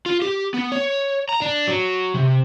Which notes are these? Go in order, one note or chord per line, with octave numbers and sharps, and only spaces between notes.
F4
G4
B3
C#5
A#5
D4
F#3
C3